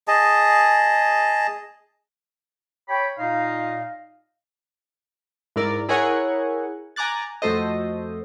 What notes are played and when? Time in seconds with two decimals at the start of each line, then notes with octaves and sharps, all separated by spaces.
0.08 G#4 D#5 A5
2.89 C#5 G5 B5
3.19 A#2 D#4 D#5 F5
5.56 G#2 E4 A#4 D5
5.89 E4 G#4 A#4 C#5 F#5 G#5
6.96 G#5 A#5 D6 F#6 A6
7.42 F2 A3 F#4 A4 C5 D#5